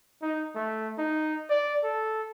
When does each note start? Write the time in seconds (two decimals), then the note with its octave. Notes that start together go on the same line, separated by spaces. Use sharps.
0.22 D#4
0.55 A3
0.98 D#4
1.50 D5
1.84 A4